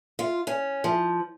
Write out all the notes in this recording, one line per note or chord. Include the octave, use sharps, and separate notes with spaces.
F4
C#4
F3